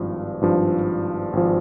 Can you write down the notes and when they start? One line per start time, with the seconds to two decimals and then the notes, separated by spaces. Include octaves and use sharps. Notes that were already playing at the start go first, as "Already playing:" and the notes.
Already playing: G#1 G2 F3
0.41 G#1 G2 F3
1.33 G#1 F3